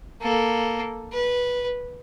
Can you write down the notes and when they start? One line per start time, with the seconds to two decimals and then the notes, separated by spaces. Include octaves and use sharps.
0.22 A#3 A4
1.12 B4